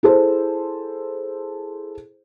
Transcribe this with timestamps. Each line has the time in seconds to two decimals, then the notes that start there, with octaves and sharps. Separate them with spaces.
0.03 E4 G#4 A4 C5